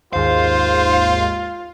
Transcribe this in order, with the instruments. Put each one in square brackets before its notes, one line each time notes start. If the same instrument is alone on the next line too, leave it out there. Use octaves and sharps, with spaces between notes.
[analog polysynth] G#1 D#2 G#2 [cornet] F4 [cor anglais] C5 [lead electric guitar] F5